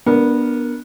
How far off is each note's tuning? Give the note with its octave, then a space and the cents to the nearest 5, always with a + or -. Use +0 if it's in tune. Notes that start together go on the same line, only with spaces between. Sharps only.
B3 -20 D4 +0 A#4 +0